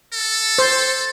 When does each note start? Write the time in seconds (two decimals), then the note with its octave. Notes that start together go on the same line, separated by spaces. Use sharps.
0.13 A4
0.58 C5